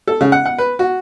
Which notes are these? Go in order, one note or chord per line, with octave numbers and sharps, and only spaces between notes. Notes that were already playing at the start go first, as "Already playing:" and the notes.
A4
C#3
F#5
F#5
B4
F#4